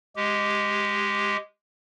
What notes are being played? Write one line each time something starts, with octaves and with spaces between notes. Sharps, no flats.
G#3 G4